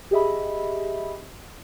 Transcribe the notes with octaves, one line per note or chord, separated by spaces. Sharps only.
G4 G#4 D#5 E5 B5